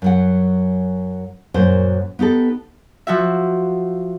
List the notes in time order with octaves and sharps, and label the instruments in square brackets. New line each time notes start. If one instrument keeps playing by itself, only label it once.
[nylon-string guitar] F#2 F#3 F#5
F#2 A#2 F#4 C5
B3 D#4 G4 A4
[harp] F3 F#4 E5